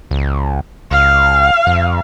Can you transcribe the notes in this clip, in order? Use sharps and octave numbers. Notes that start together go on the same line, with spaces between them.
C#2
C#2 F5
F2